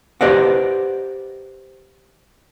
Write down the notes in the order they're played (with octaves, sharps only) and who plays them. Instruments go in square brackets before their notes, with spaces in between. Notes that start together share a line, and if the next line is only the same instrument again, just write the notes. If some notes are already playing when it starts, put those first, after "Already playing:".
[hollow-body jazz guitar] G4 B4 C5 D5 D#5 F#5